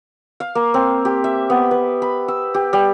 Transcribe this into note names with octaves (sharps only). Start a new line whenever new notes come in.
F5
A#3
C4
G4
E5
B3
B4
B5
E6
G4
G3